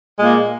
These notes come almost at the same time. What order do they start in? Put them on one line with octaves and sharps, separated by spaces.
G#3 A#2 A#3